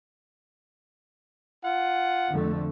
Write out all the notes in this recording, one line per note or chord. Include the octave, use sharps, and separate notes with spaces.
F4 F#5
F2 D3 A3